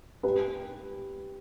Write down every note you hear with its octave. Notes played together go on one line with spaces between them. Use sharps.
G4 B4